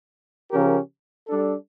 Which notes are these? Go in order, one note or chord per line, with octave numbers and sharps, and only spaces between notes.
C#3 F3 C#4 G4 A#4
G3 D4 A4